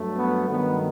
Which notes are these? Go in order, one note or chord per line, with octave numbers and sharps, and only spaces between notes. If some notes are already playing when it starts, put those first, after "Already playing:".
Already playing: G2 F#3 A3
B3
G2 D#3 F#3 A3 B3